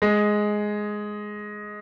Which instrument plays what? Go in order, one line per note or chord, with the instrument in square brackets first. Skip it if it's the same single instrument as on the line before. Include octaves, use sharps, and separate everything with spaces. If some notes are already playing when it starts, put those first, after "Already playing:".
[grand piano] G#3